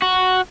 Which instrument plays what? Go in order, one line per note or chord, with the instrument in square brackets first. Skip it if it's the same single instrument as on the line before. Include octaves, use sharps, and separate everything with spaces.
[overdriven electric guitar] F#4